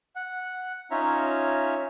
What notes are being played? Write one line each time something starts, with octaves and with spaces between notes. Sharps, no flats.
F#5
C#4 D#4 F4 C#5 E5 A#5